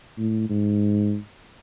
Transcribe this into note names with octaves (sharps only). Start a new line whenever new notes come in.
A2
G#2